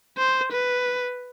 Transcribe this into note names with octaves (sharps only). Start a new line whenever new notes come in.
C5
B4